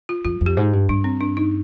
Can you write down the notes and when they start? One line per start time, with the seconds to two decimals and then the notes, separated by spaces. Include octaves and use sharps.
0.09 F4
0.25 F2 F4
0.41 F2
0.46 G4
0.57 G#2
0.73 G2
0.89 G2 D4
1.04 C4
1.21 D4
1.37 D#4